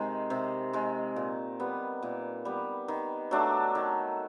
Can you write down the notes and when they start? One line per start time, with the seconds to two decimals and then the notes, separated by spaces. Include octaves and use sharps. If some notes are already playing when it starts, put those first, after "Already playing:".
Already playing: C3 D#3 G#3
0.30 C3
0.73 D#3 G#3
1.16 A#2
1.60 G3 B3
2.03 A#2
2.45 G3 B3
2.88 D#3
3.31 F#3 A3 D4
3.75 D#3